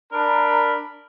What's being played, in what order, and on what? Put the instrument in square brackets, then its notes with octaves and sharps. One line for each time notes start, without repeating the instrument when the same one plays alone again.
[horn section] D4 A#4 B5